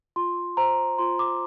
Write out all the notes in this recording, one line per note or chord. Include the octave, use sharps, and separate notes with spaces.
F4 C6
C5 A#5
F4 C6
D6